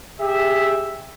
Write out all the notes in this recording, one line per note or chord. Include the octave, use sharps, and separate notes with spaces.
G4 G#4 E5